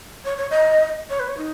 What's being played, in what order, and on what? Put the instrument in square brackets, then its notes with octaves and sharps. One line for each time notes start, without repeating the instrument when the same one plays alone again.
[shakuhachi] C#5
C#5
D#5
C#5
B4
C#5
D#4